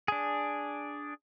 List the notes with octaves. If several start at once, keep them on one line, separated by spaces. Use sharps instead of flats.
D4 G#4